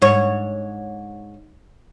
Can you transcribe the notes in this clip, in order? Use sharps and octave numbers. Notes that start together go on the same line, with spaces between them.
G#2 C#5